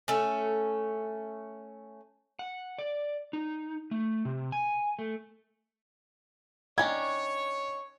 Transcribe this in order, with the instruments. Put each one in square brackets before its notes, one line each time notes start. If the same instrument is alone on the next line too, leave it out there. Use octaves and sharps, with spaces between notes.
[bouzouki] A3 C#4
[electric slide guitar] F#5
D5
D#4
A3
C3
G#5
A3
[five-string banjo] D#3 C#4 D4 [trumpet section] C#5 [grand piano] G#6